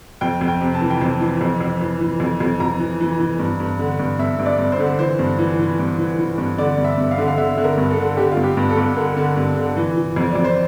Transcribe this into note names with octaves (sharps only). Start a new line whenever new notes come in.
F2 G5
F2
G5
C3
A5
E3
G5
F2 A5
E3
F2
F2
E3
E3
F2
F2
F2 A#5
E3
E3
E3
G2
G2
D3
G2
G2 E5
G2
D5
G2
C5
D3
E3 C5
G2
E3
E3
G2
E3
E3
G2
D3 D5
G2
E5
G2
F5
D3
F5
D3 E5
D3
A#4
G2
A4
D3
D3 G4
F4
G2
G4
G2
A4
G2
D3 A#4
D3
G2
D3
E3
E3
F2
F2 D5
C5